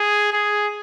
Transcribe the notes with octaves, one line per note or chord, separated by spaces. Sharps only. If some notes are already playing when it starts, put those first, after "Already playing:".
Already playing: G#4
G#4